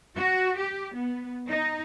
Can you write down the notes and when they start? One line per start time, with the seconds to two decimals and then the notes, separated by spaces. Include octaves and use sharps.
0.16 F#4
0.57 G4
0.95 B3
1.48 D#4